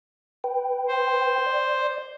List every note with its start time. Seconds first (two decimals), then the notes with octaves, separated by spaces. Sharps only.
0.44 B4 G5
0.88 C5
1.46 D5